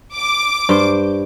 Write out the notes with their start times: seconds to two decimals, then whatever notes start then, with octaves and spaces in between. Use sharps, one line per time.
0.16 D6
0.69 G2 C5